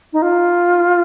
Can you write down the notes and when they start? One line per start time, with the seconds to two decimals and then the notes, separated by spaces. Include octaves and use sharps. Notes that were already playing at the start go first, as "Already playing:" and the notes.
0.13 D#4
0.22 F4